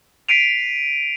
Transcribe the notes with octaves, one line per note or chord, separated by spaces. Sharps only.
B6 C7 D7 D#7 F7